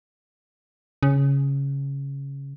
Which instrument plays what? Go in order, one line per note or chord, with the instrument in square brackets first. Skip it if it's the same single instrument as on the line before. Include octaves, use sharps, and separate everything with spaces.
[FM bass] C#3